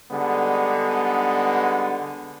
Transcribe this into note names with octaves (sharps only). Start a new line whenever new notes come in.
D3 G3 G#3 B3 D#4